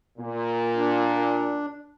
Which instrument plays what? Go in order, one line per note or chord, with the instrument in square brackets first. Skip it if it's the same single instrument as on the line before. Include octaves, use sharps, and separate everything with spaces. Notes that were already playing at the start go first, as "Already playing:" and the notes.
[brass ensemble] A#2
[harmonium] D4